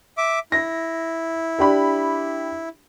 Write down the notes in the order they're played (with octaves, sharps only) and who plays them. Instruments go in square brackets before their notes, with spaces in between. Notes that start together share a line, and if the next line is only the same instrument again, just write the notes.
[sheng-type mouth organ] E5 D6
[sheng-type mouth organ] E4 [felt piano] A#6
[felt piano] D4 G4 B5